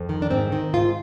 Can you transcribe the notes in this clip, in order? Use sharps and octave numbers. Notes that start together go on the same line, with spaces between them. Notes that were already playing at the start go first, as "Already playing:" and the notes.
Already playing: F2
D#3
D4
G#2 C4
D#3
G#2 F4